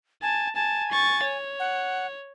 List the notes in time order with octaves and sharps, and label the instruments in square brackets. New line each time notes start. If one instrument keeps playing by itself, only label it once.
[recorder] G#5 [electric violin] A5
[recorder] G#5 [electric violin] A5
[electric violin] C#6 A6
C#5
[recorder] F#5